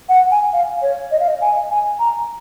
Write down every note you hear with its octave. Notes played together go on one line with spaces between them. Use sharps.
F#5
G#5
F5
C#5
D#5
F5
D#5
G#5
G#5
A#5